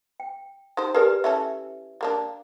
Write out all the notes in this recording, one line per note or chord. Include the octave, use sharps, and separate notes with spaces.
G5
D#4 G4 C5
G4 G#4 A#4 B4 D5
E3 C#4 A4 E5
G3 A#3 D4